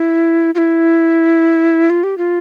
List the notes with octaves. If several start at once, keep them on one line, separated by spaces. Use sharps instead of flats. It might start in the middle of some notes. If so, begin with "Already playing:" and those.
Already playing: E4
F4
E4
F4
G4
F4